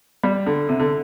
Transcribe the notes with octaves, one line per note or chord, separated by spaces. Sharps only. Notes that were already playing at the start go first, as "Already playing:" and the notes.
G3
D3
C3
D3